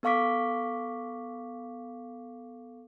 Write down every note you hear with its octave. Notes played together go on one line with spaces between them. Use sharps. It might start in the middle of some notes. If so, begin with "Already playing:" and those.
B3 A4 F5 C#6 D6 B6